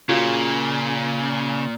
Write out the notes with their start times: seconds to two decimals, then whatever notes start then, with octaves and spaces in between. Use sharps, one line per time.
0.09 A#2 C#3 F4 F#4 F5